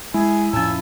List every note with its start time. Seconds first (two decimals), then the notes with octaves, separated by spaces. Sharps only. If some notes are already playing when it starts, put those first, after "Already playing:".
0.14 G#3 E4 G#4 G#5
0.53 F2 A2 F3 C#4 G#5 E6